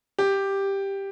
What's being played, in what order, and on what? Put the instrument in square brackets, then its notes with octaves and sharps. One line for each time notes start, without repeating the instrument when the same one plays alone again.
[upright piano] G4